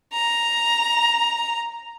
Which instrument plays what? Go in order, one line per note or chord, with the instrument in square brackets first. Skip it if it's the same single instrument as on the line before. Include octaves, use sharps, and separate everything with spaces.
[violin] A#5